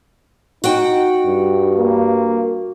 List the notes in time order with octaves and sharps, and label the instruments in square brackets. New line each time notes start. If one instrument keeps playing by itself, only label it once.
[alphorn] D#4 [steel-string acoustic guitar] F#4 G5
[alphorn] G2
[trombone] A#3